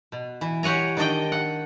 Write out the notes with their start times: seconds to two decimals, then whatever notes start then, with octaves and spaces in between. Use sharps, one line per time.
0.12 B2
0.41 E3
0.63 G4 C#5 F#5 G#5 A#5
0.97 D#3 D4 D#5 G5
1.32 F#5